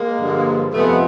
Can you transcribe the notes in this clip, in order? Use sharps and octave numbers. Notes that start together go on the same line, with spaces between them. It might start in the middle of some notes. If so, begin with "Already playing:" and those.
Already playing: G#3 A#3
G2 D3 F3
F2 C3 F3 G#3 A3 B3